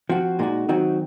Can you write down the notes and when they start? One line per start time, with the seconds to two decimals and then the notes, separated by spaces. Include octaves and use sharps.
0.10 F3 C4 F#4
0.39 A#2 G#3 D#4 F#4
0.69 D#3 F#3 C4 D#4 F#4